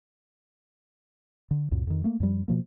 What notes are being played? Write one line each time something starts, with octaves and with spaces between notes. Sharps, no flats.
D3
C#2 F#2 A#2
F2 D#3
A3 A#3
F#2 F3 G3
B2 F3 A#3